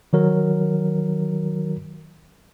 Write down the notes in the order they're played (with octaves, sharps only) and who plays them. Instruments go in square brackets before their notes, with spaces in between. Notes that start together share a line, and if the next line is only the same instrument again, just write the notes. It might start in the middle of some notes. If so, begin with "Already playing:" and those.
[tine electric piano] D#3 F#3 A#4